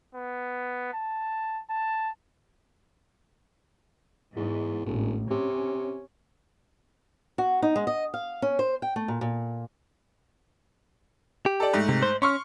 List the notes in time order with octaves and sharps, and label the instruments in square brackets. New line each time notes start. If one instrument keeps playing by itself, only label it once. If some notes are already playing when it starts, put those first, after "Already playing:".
[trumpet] B3
A5
A5
[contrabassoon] E2 [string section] G#2
[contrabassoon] E1 [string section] A1
[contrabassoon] C3 [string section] C#4
[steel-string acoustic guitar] F#4
D#4
G#3
D#5
F5
C#4
C5
G5
A3
A#2
A#2
[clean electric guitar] G4
[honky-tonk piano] A4 D5
G#2 A3
[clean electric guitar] C3
C5
[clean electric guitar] C#4 [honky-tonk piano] C6 C#6 F6